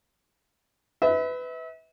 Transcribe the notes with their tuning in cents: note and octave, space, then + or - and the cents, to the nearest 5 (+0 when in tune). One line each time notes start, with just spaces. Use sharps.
B4 +20 E5 -35